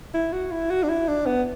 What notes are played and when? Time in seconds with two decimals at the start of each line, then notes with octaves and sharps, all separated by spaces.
0.14 E4
0.33 F#4
0.51 E4
0.70 F#4
0.83 D4
0.89 E4
1.08 D4
1.26 B3